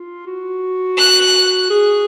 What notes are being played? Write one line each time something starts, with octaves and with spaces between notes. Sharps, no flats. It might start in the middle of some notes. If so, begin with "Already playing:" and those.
Already playing: F4
F#4
F#6
G#4